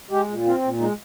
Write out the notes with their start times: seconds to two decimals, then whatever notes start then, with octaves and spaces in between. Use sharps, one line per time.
0.10 G#3 G4
0.28 A#2
0.45 C4 F4
0.62 A#2
0.79 G#3 D#4